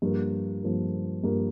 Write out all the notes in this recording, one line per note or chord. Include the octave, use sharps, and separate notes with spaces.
G2 F3 A#3
G2 F3 A#3
G2 F3 A#3